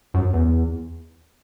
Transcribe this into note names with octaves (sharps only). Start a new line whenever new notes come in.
F#2
E2